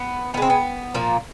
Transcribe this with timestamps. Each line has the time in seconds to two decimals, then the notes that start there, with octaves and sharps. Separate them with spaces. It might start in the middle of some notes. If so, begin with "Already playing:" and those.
Already playing: B3
0.34 D#3 B3
0.37 G#3 C4
0.50 B3
0.94 A#2 F3 A#3